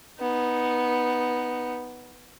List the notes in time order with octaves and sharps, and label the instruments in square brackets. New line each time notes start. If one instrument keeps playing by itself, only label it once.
[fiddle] B3 D#4